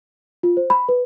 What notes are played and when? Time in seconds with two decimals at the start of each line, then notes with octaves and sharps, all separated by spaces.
0.43 F4
0.57 C5
0.70 B5
0.89 B4